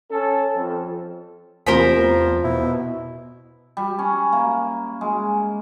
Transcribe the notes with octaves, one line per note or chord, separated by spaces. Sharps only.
C#4 A4
F2
E2 C3 F3 A3 A#4 C5 G#5 B5
B2 E4
G3
C#4
A#3
G#3